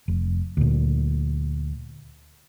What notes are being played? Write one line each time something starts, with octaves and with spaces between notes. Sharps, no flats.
F1
D2 A#2